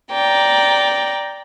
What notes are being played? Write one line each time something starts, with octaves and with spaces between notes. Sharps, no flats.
D5 G5 A#5